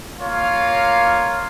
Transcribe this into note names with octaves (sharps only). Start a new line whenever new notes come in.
A#3 F4 C#5 F5